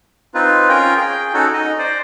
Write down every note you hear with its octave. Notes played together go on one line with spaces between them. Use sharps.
C4 D#4 F4 B4
C#4 F4 A#4 G5
G#4 G5
C#4 D#4 F#4 A4
D#4 D#5
C5 D5